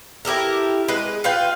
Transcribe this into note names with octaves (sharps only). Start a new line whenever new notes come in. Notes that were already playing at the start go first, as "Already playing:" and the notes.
E4 G4 A4 A#4
G#3 B4
F4 B4 F5 G5